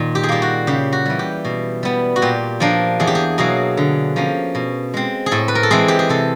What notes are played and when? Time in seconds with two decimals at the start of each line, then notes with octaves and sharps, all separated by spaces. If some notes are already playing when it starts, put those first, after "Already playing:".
Already playing: A#2 D#3
0.15 G4
0.23 G#4
0.29 G3 A#3 G4
0.42 F#4
0.67 C#3 G4
0.93 F#4
1.05 E3 G3
1.19 G4
1.45 B2
1.83 G3 B3
2.16 F#4
2.22 A#2 G4
2.60 F3 A#3 D4
3.00 E2 G#4
3.07 G4
3.15 G#4
3.38 B2 F#3 A#3 G#4
3.77 D3
4.16 F3 A#3 C#4
4.55 B2
4.94 G#3 C4
5.26 G#4
5.31 A2 A4
5.48 B4
5.55 A#4
5.63 A4
5.71 E3 G#3 C4 G#4
5.88 G4
5.99 G#4
6.09 C3 A4